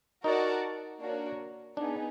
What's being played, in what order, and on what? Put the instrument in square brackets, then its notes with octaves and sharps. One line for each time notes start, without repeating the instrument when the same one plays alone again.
[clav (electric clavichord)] D#4 [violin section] F#4 A#4 D5 F#5 A5
[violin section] A#3 D4 F#4 A#4 C#5
[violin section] B3 D#4 G#4 [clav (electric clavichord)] D4